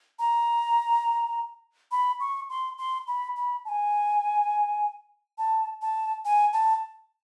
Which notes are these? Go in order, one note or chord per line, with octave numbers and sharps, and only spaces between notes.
A#5
B5
C#6
C6
C6
B5
B5
A5
G#5
A5
A5
G#5
A5